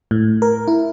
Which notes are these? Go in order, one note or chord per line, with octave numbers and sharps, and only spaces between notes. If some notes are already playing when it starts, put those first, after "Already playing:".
A2
A#4
E4